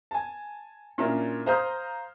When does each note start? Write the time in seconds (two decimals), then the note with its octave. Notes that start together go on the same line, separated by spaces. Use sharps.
0.11 G#5 A5
0.98 A#2 C#4 D4 E4 A#4
1.46 C5 F5 A#5 D#6 F6 G6